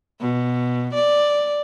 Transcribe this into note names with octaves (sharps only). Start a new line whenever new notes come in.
B2
D5